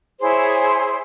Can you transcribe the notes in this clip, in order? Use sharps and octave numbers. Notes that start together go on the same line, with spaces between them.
E4 G#4 C5 C#5